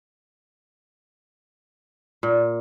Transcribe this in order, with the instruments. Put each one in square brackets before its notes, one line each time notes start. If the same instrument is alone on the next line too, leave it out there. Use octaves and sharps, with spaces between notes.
[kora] A#2